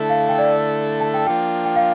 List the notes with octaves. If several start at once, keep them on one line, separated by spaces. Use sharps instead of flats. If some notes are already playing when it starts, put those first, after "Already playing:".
Already playing: D3 A3 E4 A4 A5
F5
G5
D5
A5
G5
F3 A#3 D4 F4 G5
G5
F5